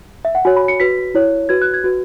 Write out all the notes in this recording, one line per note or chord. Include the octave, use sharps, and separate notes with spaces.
E5
F#5
F#4 C#5 G#5
B5
C#7
F#4 B4 B6
E4 C#5
F#4 B4 G#6
F#6
G#6
F#4 B4